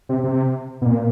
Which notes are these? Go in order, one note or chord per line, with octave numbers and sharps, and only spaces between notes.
C3
C3
B2
A#2